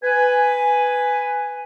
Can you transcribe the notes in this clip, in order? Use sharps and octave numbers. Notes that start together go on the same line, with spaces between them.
B4 G#5